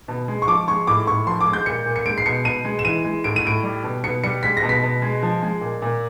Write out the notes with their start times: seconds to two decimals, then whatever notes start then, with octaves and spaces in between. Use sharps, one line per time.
0.08 B2
0.28 G#3
0.42 C#6
0.48 F3 D6
0.68 G#3 C#6
0.87 A2 D6
1.07 A2 C#6
1.27 F3 C6
1.41 D6
1.46 G#3
1.53 G6
1.66 A#2 C#7
1.86 A#2
1.96 C#7
2.06 G#3 D7
2.18 C7
2.26 B2 C#7
2.45 B2 D#7
2.65 G#3
2.79 E7
2.85 E3 D#7
3.05 G#3
3.24 A2 D7
3.36 D#7
3.45 A2 D7
3.64 G3
3.84 B2
4.04 B2 C#7
4.24 G3 C#7
4.43 G#3 B6
4.57 A#6
4.63 B2
4.69 B6
4.83 B2
5.02 G#3
5.23 F3
5.42 G#3
5.61 A#2
5.82 A#2